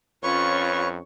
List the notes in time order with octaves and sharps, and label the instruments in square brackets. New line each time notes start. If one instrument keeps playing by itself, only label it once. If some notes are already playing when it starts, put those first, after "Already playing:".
[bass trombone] F2 [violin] C#4 C#6 [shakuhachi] F4 [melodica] B4 C#5